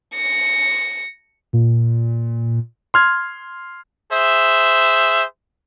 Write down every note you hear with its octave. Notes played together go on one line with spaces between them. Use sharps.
A#6 C#7
A#2
C6 F6 G#6
G#4 C5 E5